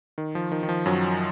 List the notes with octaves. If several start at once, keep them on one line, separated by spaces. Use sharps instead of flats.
D#3
F3
D#3
D#3
F3
F#2 F#3